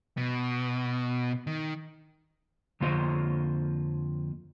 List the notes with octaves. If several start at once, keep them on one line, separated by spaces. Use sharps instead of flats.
B2
D#3
F2 D3 A#3 F4 C5 D#5